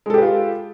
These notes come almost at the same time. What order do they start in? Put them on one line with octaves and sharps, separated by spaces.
G#3 A4 G4 B4 F4